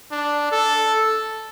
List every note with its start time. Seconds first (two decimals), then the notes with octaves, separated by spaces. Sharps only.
0.12 D4
0.52 A4